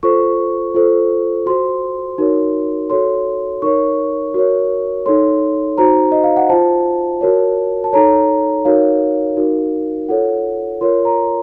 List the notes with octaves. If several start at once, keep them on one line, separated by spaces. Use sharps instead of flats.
F4 A4 C5 C#6
F4 A4 C5
F#4 C5 C6
D#4 F#4 A#4 C#5
F#4 A4 C#5 C6
D#4 A#4 C#5 C#6
F#4 A#4 C#5
D#4 A4 C#5 C6
D#4 F#4 C5 A#5
D#5
F5
F#5
F4 C5 A5
F#4 A#4 C#5
A5
D#4 A4 C#5 A#5
D#4 F#4 A#4 C#5 F5
D#4 F#4 A#4
F4 A4 C#5 F#5
F4 A#4 C#5 C6
A#5